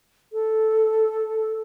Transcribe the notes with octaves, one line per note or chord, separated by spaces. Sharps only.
A4